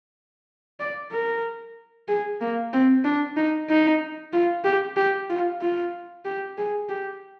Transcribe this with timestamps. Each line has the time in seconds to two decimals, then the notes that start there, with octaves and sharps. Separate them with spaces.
0.80 D5
1.12 A#4
2.08 G#4
2.41 A#3
2.73 C4
3.05 D4
3.37 D#4
3.69 D#4
4.33 F4
4.65 G4
4.97 G4
5.29 F4
5.61 F4
6.25 G4
6.58 G#4
6.89 G4